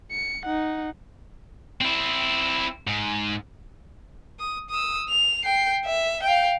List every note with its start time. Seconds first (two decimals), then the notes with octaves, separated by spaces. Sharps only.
0.12 C#7
0.46 D#4 F#5
1.81 C4 E4
2.87 G#2
4.40 D#6
4.70 D#6 E6
5.09 F7
5.45 G5 C7
5.86 E5
6.23 F5 G5